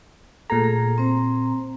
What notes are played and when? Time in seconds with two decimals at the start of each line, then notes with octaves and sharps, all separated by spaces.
0.50 A#2 A3 G#4 A4 A#5
0.64 G#4
0.98 C4 C5